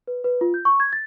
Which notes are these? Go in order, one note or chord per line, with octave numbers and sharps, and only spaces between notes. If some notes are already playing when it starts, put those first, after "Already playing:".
B4
B4
F4
G6
C#6
G#6
A6